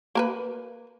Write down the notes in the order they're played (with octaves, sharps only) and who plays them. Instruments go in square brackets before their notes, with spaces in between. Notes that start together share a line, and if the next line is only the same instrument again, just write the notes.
[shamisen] A#3 A#4 B4